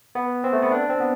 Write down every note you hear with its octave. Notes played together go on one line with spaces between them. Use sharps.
B3
C4
A3
B3
D4
C4
B3